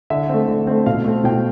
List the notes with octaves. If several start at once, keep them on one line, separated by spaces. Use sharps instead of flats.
D3 E5
A3 C4
D3
A3 C4
B2 F5
A3 C4
B2 G5